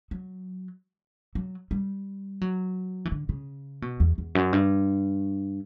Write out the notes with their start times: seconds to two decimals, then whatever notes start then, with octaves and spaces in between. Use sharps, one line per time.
0.11 F#3
1.35 F#3
1.71 G3
2.41 F#3
3.05 E3
3.12 D3
3.29 C#3
3.82 B2
4.00 E2
4.18 E2
4.35 F#2
4.53 G2